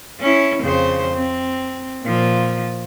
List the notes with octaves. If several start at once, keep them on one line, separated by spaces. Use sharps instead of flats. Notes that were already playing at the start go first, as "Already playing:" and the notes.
C#4 E4
F2 C#3 C5
C4
A#2 F3